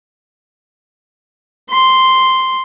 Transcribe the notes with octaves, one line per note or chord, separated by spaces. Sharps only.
C6